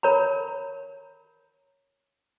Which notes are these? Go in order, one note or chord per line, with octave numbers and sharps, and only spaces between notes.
A#4 C#5 A#5 B5